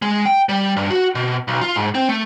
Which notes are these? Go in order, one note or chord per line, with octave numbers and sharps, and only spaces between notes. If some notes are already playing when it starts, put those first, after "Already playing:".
G#3
G5
G3
G2
F#4
B2
B1
F4
G#2
C4
A3